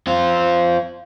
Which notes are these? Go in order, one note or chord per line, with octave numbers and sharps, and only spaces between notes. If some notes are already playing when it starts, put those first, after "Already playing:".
C4 F4